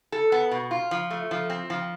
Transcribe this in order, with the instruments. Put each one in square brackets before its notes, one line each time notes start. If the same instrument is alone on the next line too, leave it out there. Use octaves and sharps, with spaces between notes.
[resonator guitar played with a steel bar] A4
B3
B2
F4
F3
A3
F3
C4
F3